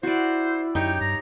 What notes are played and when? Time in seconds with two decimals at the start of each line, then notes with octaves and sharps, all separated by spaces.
0.03 E4 F#4 C5 D5
0.75 F#2 D#4 G4 C#5 G5
1.01 G2 A#5